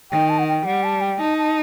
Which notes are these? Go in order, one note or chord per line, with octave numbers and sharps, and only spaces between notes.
D#3 G5
A5
F#5
G5
G3 F#5
A5
G5
D#4 A5
A5